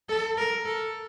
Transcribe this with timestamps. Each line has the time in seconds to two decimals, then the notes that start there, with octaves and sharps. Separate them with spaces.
0.09 A4
0.37 A#4
0.65 A4